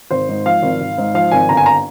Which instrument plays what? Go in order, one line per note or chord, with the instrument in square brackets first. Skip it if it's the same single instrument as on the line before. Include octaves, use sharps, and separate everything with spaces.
[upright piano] G#1 C5
G#2
F3 F5
G#1
G#1
G#2
F3 F5
G#1 G#5
G1 A#5
G#5
A#5